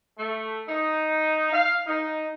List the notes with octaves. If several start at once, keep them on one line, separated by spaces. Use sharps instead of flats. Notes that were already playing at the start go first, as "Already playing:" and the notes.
A3
D#4
F5
D#4